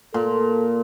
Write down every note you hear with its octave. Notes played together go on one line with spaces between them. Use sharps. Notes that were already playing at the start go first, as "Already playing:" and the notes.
A#2 A4